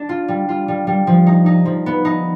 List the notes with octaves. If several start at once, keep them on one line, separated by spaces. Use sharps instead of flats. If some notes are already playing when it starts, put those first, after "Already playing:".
Already playing: D4
F4
G3
F4
G3
G3
F3
D#4
D#4
F3
B3
D#4